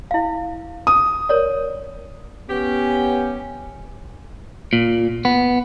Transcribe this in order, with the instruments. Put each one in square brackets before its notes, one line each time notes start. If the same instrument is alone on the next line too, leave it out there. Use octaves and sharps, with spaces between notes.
[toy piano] E4 F5
[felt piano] D#6
[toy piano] A#4 C#5 D5
[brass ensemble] B3 C#4 [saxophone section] G4
[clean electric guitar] A#2
B3